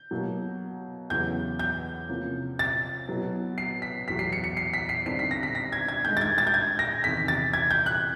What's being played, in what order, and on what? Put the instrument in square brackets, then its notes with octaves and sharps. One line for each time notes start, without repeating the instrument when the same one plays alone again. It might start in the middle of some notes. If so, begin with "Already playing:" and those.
Already playing: [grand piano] G6
[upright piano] B2 F#3 A#3
[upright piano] E2 C#3 F#3 B3 E4 [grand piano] G6
[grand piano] G6
[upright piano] C3 F3 A#3 C#4
[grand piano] A6
[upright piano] B2 F#3 B3 E4
[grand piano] C7
B6
[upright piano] E2 B2 F#3 [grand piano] B6
[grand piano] C7
C#7
C#7
C7
B6
C7
[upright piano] G2 D3 G3 C4 D#4 [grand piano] C7
[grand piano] B6
A#6
B6
A#6
G#6
G#6
[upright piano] G2 D#3 G#3 [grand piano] G6
[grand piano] A6
G#6
A6
G6
G#6
A#6
[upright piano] E2 C3 D#3 [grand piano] B6
[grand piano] A6
G#6
G6
F#6